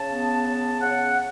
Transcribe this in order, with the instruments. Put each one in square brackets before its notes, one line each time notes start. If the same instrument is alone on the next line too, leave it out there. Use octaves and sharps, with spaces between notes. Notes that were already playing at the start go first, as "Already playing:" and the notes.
Already playing: [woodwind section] C#3 A5
B3
C#3
C#3 F#5